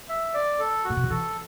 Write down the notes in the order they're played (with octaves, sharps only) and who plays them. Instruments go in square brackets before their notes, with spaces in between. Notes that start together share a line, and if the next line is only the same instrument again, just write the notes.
[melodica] E5
D5
A4
[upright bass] A2 [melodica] F#4
[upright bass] B2
D3
[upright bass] E3 [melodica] A4